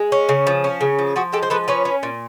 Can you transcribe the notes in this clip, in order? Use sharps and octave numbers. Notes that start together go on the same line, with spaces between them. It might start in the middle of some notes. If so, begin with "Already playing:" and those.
Already playing: G#3
C#4
C#3
F3
C#4
C#3
F3
F3 F#4 G#4
G#3 G4 A4
C5
F3 A4 B4
C#4 B4 C#5
C#4
A#2